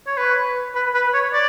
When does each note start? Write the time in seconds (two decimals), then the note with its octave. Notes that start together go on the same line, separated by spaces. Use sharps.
0.07 C#5
0.17 B4
0.75 B4
0.94 B4
1.14 C#5
1.33 D5